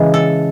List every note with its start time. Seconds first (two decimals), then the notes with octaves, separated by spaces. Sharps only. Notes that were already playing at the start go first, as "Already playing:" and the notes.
Already playing: C#3 E3 G#3
0.14 A4